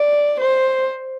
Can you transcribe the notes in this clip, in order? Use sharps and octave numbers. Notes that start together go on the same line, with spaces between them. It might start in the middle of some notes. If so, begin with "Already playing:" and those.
Already playing: D5
C5